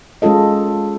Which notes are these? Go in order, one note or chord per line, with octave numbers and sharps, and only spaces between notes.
G#3 C#4 F4 A4 D#5